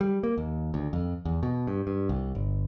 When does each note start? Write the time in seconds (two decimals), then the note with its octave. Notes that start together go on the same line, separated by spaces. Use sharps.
0.01 G3
0.23 A#3
0.38 D#2
0.74 D2
0.93 F2
1.25 E2
1.43 B2
1.67 G2
1.87 G2
2.09 C2
2.35 G1